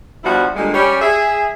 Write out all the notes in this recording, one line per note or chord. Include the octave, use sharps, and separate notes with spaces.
G2 B2 F3 G3 E4 F#4
A#2 D3 G3 G#3
G3 C#4 G4
G#4 E5